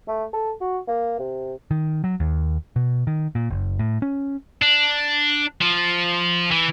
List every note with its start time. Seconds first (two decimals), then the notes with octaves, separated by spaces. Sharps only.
0.08 A3
0.33 A4
0.61 F#4
0.88 A#3
1.19 C3
1.71 D#3
2.04 F#3
2.20 D#2
2.76 B2
3.07 D#3
3.35 A#2
3.50 F#1
3.79 A2
4.02 C#4
4.62 D4
5.62 F3
6.51 E3